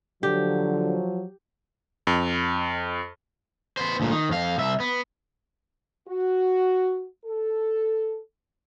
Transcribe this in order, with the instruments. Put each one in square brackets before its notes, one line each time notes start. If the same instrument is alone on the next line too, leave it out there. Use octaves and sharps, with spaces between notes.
[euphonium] D3 [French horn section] F3 F#3 [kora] G4
[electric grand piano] F2
[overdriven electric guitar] B3 C5
D2 A#2
D#3
F2 F5
C2 E5
B3
[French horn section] F#4
A4